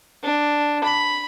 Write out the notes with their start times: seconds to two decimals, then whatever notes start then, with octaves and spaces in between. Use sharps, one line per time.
0.23 D4
0.84 B5